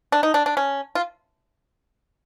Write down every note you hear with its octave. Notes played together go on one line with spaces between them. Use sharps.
D4
D#4
D4
D4
C#4
F4